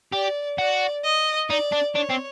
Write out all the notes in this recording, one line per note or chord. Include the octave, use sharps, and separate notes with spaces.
G4 D5
F#4 D5
D#5
D#4 D5
D4
D4 C#5
C4